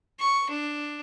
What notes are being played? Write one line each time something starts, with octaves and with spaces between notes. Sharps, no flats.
C#6
D4